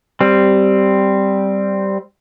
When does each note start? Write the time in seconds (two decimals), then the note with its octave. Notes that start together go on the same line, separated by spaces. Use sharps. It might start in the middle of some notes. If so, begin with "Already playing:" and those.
0.20 G3 C4